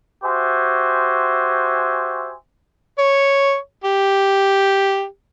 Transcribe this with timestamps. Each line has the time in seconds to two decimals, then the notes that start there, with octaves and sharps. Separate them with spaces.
0.23 F#4 G4 C5 E5 G#5
2.98 C#5
3.84 G4